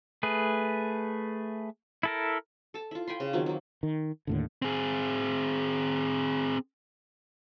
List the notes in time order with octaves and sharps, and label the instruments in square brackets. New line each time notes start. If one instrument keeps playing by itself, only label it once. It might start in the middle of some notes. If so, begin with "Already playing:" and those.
[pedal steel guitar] A3 G#4 B4
E4 A4 A#4
[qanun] A4 A5
E4 F4
G5 G#5 B5 C6
C#3
D#3 F#3 C4 F4
F#3 A#3
[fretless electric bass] D#3
D#2 A2 D3
[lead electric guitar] C4 G#4